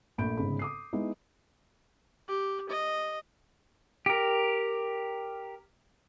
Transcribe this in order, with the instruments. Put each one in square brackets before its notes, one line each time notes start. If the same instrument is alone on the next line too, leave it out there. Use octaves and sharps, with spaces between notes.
[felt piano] A#1 A3 B5 G6 D7
G1 G#2 C#3 G#4 B5
D6 D#6 C7
G#3 B3 D#4 E4
[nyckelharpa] G4
D#5
[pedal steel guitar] G4 A#4